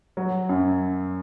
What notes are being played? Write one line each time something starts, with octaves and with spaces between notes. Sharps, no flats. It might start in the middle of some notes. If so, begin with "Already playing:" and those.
F#3
F#2